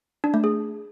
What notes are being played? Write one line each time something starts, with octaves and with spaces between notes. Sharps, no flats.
D4
A3
G#4